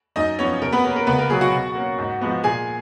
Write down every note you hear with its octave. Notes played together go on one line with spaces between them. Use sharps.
F#2 D#4 D#5
F3 B3 C#4 C#5
B2 A#4
B3 B4
A#3 C#4 A#4
A#4
C#2 B3 B4
A#4
B2 F#3 B3 G#4
F#4 F#5
B2
A#3 C#4
G#2
F3 G#3 B3
A#2 G#4 G#5